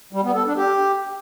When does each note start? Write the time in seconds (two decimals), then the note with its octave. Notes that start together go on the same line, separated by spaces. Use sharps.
0.13 G3
0.24 B3
0.35 A4
0.46 D4
0.56 G4